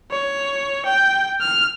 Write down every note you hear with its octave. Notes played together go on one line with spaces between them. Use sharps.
C#5
G5
F6